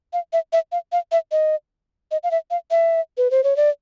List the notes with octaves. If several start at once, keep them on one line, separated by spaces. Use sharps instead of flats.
F5
E5
E5
F5
F5
E5
D#5
D#5
F5
E5
F5
E5
B4
C5
C#5
D5